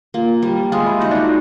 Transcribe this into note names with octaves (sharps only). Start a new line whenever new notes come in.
A#3 F4
G3
G#3 F4
E4
D#4 F#4
D4
D#4